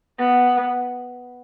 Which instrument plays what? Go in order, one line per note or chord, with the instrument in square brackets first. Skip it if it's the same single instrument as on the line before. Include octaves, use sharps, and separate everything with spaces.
[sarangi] B3